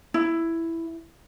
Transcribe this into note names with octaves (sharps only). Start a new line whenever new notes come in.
E4